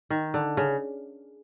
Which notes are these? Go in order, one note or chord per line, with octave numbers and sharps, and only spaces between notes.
D#3
D3
C#3